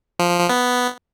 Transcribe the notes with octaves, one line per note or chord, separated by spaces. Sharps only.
F3
F3
F3
B3